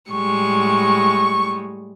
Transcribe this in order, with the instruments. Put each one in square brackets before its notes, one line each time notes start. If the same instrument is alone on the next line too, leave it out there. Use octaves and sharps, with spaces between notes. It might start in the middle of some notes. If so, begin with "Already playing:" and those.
[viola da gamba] A2 G3 G#3 [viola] C#6